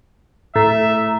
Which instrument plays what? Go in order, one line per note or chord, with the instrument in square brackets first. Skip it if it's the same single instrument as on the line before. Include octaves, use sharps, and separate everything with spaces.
[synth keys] A2 [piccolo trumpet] E5 [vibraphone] A#5